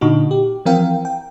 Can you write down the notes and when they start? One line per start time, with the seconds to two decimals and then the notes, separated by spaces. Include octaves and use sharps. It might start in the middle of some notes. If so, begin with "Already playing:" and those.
0.01 A#2 D3 D#4 F#4
0.31 G4
0.65 E3 F3 C4 A#4 F5 G5
1.05 G5